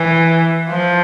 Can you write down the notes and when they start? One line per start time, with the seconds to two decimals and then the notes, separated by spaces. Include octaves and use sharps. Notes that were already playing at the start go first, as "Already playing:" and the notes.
Already playing: E3
0.70 F3